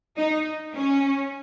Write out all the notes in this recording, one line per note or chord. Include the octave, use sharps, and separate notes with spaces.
D#4
C#4